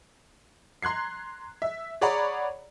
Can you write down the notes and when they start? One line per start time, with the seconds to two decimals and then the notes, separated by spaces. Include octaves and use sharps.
0.82 A#5 C6 F#6 G#6 C7
1.62 E5
2.01 G#4 C#5 D5 F#5 A#5 B5